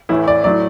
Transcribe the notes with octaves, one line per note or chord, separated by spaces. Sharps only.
A1 A2 E3 E4
D5
A2 F#3 D5